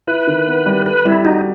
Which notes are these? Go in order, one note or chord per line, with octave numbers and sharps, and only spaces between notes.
E4 B4
D#3
B3
G3
A4 B4
G3 E4
D#4 F#4